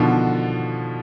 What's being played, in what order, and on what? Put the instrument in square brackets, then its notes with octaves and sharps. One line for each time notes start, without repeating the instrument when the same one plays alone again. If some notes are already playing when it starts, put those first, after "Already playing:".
Already playing: [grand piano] B2 D3 D#3 F3